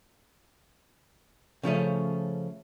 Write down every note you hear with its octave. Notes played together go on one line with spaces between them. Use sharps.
C#3 F3 A3 C#4